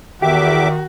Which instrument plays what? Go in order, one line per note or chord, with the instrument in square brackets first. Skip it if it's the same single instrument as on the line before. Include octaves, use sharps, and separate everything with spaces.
[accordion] E2 E5 D6 [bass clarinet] D#3 [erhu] F#4 [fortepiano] G4